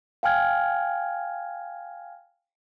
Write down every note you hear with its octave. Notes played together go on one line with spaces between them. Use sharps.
F5 G5 G#5 F6 G#6